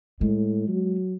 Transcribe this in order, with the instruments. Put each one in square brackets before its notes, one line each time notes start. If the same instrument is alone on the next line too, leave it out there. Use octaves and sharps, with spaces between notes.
[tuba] A2 [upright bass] G#3
[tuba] F#3